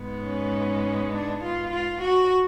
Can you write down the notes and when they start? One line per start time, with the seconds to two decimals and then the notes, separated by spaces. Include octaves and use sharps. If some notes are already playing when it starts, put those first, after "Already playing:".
Already playing: G#2 G#3 B3
0.22 C#4
1.11 D4
1.42 F4
1.71 F4
2.01 F#4